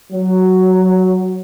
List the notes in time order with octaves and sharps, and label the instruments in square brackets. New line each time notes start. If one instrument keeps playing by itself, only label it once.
[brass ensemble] F#3